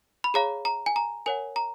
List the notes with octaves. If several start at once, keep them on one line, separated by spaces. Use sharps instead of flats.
B5
G#4 C#5 F5 A#5
A#5
G#5
A#5
A#4 C#5 F#5 G#5
A#5